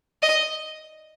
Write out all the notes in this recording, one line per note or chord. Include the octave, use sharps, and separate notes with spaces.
D#5